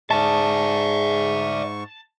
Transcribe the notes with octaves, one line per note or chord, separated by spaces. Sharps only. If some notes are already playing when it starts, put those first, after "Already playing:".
G#2 G#4 D5 E5 A5 C#6